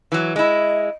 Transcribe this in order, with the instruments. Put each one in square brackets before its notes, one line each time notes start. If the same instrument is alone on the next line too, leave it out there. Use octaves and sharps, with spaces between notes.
[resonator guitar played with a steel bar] E3 F#3
[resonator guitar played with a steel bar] G#3 E4 [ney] D#5